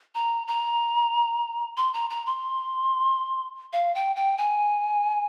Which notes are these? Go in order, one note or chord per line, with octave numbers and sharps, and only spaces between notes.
A#5
A#5
C6
A#5
A#5
C6
F5
G5
G5
G#5